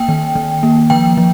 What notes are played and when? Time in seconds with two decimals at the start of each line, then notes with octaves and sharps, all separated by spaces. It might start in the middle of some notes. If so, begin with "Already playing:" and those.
Already playing: A#3 G5
0.09 D#3
0.35 D#3
0.63 A#3
0.90 F3 G5
1.17 F3